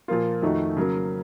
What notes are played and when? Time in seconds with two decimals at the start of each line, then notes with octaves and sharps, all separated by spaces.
0.08 A#2 F3 A#3 F4
0.42 F2 D#3 A3 D#4 F#4
0.77 C#3 F#3 A#3